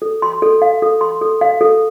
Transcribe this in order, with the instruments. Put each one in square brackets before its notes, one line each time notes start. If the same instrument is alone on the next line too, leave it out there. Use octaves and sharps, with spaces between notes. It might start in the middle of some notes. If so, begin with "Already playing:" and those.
[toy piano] A4
C6
A4
F5
A4
C6
A4
F5
A4